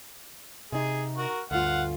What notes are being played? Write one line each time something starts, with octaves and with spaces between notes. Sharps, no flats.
C3 D#4 G#4
F#4 A#4
D2 G2 F4 F5 F#5